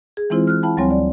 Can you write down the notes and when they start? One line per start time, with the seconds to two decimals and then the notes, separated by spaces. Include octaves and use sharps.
0.17 G#4
0.30 E3 G#3 C4 E4 F4 C5
0.47 F6 F#6
0.63 E4 F5 G5 A5 B5
0.77 D2 F#3 G3 C4 C#5 G#5
0.90 D5